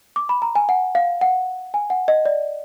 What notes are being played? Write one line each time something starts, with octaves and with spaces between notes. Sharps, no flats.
D6
B5
A#5
G#5
F#5
F5
F#5
G#5
F#5
D#5
D5